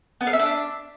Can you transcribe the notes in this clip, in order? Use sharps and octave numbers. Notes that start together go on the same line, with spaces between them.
B3
F5
E5
D4